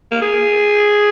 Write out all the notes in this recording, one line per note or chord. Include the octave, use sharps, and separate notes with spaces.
A#3
G#4